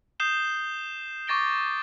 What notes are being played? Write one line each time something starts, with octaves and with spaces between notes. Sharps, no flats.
D#6 G6 C7 E7 G7
C#6 D6 A6 A#6 D7 G7